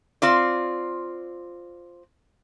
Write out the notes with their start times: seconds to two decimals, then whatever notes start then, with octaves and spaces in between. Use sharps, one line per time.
0.22 C4 F4 D5